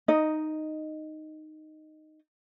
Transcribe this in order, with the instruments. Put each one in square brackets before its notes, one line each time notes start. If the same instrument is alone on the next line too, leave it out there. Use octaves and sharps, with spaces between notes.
[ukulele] D#4 D#5